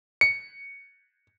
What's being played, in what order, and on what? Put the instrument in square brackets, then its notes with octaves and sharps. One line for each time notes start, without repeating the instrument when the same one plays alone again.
[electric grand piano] C#7